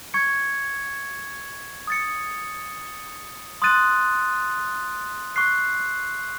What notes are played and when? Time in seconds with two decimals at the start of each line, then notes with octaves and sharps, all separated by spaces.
0.14 C#6 G#6 C#7
1.87 D#6 A6 C#7
3.62 C6 D#6 F#6 A6 D#7
5.36 C#6 F#6 C7